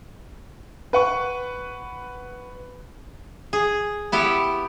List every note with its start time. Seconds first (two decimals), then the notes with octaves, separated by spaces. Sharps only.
0.93 B4 F#5 C#6
3.53 G#4
4.12 B3 E4 G4